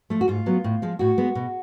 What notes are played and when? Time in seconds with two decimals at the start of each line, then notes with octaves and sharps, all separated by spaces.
0.10 F3 A3
0.21 F#4
0.28 G#2 F4
0.46 F#3 B3
0.64 A2
0.82 F3 G#3
0.99 A2 F#4
1.18 G#3 B3
1.35 B2